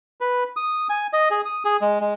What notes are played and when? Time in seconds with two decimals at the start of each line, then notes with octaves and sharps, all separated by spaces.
0.21 B4
0.57 D#6
0.90 G#5
1.13 D#5
1.31 G#4
1.45 D#6
1.65 G#4
1.82 G#3
2.01 G#3